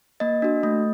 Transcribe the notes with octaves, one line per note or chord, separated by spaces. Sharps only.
A#3 D#5
D4 F#4
A3